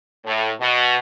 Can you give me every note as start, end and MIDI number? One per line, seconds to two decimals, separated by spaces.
0.25 0.51 45
0.60 0.97 47